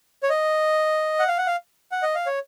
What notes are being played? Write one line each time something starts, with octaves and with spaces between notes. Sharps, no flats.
C#5
D#5
F#5
F5
F#5
F5
F#5
D#5
F5
C#5